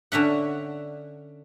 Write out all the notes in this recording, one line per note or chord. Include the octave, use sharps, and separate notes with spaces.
D3 C#4 E5 F#5